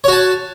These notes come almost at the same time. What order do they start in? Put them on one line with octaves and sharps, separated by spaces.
C#5 F#4 A5